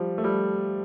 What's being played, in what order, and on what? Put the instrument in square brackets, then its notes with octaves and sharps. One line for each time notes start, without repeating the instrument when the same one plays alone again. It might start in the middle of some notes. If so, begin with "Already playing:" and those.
Already playing: [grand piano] F3 G3
A3
G3